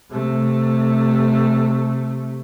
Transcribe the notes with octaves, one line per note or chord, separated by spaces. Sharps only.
C3 A3